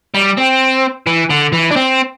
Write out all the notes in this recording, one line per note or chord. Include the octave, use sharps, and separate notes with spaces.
G3
C4
E3
D3
E3
D4
C4